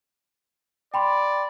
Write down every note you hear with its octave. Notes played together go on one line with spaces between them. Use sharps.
D5 G5 B5 C6